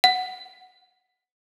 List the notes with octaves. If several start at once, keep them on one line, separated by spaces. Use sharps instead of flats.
F#5